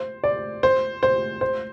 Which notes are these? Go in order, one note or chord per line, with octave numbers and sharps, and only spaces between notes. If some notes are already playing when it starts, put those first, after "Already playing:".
Already playing: C5
D5
C5
C5
C5